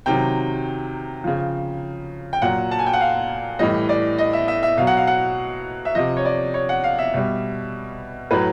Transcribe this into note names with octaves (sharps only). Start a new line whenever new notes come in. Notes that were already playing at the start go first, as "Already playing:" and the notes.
C3 D#3 F#3 G5
C#3 F3
G5
A#2 F#3 F#5
A5
G#5
G5
F#5
F5
A2 E3 G3 D#5
D5
D#5
E5
E5
E5
B2 F#3 F5
F#5
F5
F#5
E5
C3 F3 D#5
C#5
D5
C#5
F#5
F5
E5
B2 G3
A2 F#3 B4